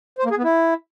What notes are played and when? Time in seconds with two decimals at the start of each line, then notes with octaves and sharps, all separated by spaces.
0.19 C5
0.25 A#3
0.31 G#4
0.37 B3
0.44 E4